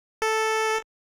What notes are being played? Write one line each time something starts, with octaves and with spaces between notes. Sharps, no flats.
A4